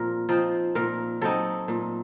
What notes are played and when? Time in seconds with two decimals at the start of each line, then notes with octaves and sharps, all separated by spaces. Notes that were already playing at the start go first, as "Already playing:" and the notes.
Already playing: A#2 F3 C4 A#4
0.29 F3 C4 D#4
0.75 A#2 A#4
1.22 F#3 C4 D#4 A4
1.68 A#2